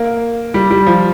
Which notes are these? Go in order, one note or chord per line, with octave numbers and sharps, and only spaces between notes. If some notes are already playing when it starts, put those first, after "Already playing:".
Already playing: A#3
G3
G3
F3